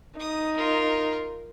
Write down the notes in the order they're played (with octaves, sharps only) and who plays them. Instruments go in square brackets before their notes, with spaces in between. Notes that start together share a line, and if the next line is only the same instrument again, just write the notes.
[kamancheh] D#4 [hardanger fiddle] D#6
[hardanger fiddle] F4 A#4